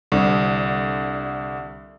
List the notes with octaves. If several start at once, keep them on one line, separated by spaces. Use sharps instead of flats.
C2 D3